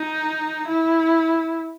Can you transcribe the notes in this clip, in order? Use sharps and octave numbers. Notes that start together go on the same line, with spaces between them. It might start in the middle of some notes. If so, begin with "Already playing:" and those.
Already playing: D#4
E4